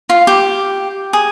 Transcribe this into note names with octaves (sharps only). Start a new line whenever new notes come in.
F4
G4
G#4